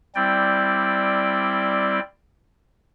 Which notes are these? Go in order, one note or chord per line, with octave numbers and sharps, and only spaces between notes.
G3 C4 E4 D5 G5